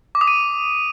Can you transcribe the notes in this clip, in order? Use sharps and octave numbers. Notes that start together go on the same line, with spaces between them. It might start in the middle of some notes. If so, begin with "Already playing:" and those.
D6
D#6
D#7